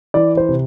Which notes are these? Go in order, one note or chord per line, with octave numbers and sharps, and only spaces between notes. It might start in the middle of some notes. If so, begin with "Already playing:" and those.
E3 D5
C5
C3